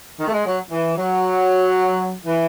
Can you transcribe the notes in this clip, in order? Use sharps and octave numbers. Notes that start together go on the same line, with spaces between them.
D#3
A3
G#3
F#3
E3
F#3
E3